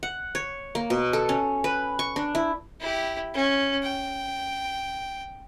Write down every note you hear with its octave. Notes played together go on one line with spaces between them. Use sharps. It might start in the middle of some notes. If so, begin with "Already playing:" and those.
F#5
C#5
A#3
B2
A4
C#4
B4
C#6
D4
E4
E4 G4
C#4
G5